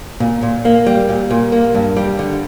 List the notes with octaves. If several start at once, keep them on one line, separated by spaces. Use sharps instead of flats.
A#2
A#2
A#3
G3
A#2
A#2
A#3
G2
G3
D3